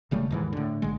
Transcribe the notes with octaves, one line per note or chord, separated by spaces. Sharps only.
E1 C#3 G3 A3
D#2 G#2 E3
A2 D3
A#1 D3 G#3